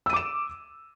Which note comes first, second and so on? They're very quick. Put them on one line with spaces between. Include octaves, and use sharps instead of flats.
E6 D#7 D6 E7